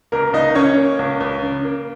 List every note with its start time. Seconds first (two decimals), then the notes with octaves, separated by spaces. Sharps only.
0.12 C#2 A#3 A#4
0.33 C#2 D#4 D#5
0.55 C#3 C#4 C#5
0.77 A#3
0.99 C#2
1.21 C#2
1.42 C#3
1.64 A#3